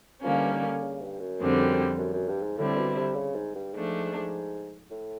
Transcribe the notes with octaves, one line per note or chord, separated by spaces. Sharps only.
D3 F3 G3 A#3 C#4
E3
D#3
D3
C#3
G2
F#2
F2 D3 G3 C4
F#2
F#2
G2
G#2
A2 D3 G3 C4 E4
B2
C3
C#3
G#2
G2
G#2 F3 A3 D4
A2